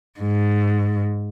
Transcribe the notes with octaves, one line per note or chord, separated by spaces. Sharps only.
G#2